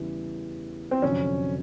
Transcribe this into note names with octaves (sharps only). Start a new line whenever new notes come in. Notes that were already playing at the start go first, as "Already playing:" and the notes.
Already playing: E2 C#3 E3 G3
C4
F1 F2 D3 F#3 C#4